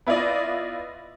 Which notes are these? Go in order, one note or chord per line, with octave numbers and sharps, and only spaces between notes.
B3 E4 F4 D5 D#5